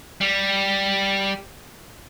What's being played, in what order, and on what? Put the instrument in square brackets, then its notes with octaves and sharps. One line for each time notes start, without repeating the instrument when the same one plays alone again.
[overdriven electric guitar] G3